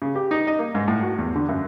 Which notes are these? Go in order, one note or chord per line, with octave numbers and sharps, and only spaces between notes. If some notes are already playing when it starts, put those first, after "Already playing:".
C#3
G4
D#4
D#5
A#3
G#2
A2
F#4
E2
D3
F#2